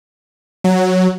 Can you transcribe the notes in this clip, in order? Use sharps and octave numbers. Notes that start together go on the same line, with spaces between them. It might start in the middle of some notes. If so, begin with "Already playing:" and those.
F#3